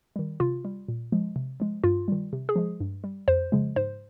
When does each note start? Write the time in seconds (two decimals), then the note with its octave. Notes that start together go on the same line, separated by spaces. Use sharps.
0.16 D#3 G3
0.40 C3 F4
0.65 G3
0.88 A#2
1.12 F3 G#3
1.36 C3
1.60 F3 G#3
1.84 G2 F4
2.08 D#3 G3
2.33 C3
2.49 G#4
2.56 F3 G#3
2.81 G2
3.04 G3
3.28 F2 C5
3.52 C#3 F3 G#3
3.76 G#2 C5